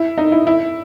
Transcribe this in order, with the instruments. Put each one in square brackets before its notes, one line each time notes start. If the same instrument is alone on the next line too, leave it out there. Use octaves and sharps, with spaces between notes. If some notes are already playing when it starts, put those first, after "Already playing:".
Already playing: [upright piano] E4
D#4
E4
E4